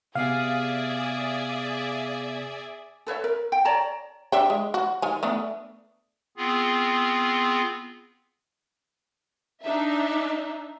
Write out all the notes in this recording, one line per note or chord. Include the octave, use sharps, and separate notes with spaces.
C3 B3 G#4 D5 E5 F5 C7
A4 B4 C#5 E5
A#4
G5
C#5 D5 A5 A#5
D4 E5 G5
G#3
F#4
D#3 G#5
A3 B3 D4
B3 C4 F4 G#4
D4 D#4 E5